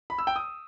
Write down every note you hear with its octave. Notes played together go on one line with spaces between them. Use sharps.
B5
E6
G5
D#6